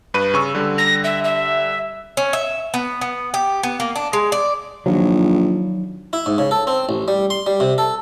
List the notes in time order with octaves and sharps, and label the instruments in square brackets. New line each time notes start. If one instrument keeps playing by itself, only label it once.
[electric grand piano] G2 B4 D#7
C#3 C#6 E6
D3 G3
[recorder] A#6
E5
E5
[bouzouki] C#4
E5
B3
B3
G4
B3
A#3
D4
G#3
D5
[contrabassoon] A#1 [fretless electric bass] D#3 F3 F#3
[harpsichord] E4
G#2
C#3
A4
C4
A1
G3
C6
G3
C3
A4